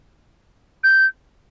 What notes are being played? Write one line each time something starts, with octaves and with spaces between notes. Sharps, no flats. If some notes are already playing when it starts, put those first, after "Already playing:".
G6